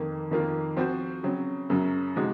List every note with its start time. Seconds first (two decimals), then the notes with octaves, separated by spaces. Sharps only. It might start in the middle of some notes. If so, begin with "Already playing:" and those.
Already playing: F2 D#3 A#3
0.31 F2 D#3 A#3 F4 A#4
0.77 F3 C4 F#4 C5
1.23 C#3 F#3 C4
1.70 F#2 C#3 F#3
2.16 C3 F3 G#3 D#4 F#4